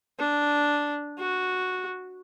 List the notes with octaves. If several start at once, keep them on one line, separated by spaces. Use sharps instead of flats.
D4
F#4